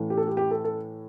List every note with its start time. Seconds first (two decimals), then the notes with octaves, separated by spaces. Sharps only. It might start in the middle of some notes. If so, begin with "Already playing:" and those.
Already playing: A2 E3
0.10 G4
0.17 A4
0.27 G4
0.37 G4
0.51 A4
0.64 A4